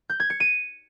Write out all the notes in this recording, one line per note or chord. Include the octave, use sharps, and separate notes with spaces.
G6
G#6
C#7
D#7